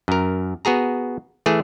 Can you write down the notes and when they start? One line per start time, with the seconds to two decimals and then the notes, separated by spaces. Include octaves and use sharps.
0.08 F#2 A#4
0.65 B3 F#4 G#4 A#5
1.46 E3 A3 G#4